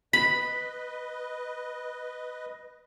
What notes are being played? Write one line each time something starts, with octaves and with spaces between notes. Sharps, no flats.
B4 D#5 B5 B6